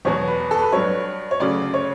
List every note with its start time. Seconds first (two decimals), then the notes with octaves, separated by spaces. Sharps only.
0.05 E2 B2 F#3 C#5
0.27 B4
0.51 A4
0.62 B4
0.72 G2 F#3 C#5
1.31 C#5
1.40 D2 C#3 F#3 D5
1.74 C#5